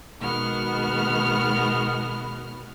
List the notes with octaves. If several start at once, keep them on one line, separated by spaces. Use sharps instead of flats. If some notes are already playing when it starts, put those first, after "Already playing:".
B2 D#3 G#3 B3 F#4 F6